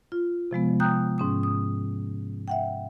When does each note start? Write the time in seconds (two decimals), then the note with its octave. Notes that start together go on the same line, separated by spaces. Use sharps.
0.12 F4
0.51 C3 F3 G#3 B3
0.80 G5 A#5 D#6 F#6 G6
1.18 G#2 C#4 D#6
1.43 D#6
2.48 E5 F#5 G5